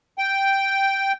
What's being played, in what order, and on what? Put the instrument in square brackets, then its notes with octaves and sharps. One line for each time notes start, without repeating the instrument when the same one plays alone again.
[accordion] G5